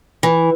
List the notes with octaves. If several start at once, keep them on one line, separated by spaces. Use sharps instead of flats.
E3